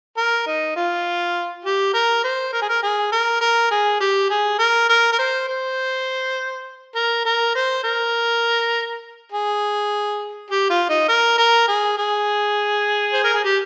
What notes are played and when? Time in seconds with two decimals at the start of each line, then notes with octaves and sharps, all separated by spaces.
0.17 A#4
0.47 D#4
0.76 F4
1.65 G4
1.94 A#4
2.24 C5
2.53 A#4
2.62 G#4
2.69 A#4
2.83 G#4
3.12 A#4
3.41 A#4
3.71 G#4
4.01 G4
4.30 G#4
4.59 A#4
4.89 A#4
5.13 A#4
5.19 C5
5.48 C5
6.95 A#4
7.25 A#4
7.55 C5
7.84 A#4
9.32 G#4
10.50 G4
10.70 F4
10.89 D#4
11.08 A#4
11.38 A#4
11.68 G#4
11.97 G#4
13.13 C5
13.24 A#4
13.34 G#4
13.44 G4